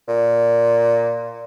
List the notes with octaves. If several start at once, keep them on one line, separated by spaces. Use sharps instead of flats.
A#2